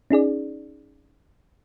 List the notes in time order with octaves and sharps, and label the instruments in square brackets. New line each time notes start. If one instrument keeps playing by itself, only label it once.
[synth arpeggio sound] C#4 D#4 G#4 D5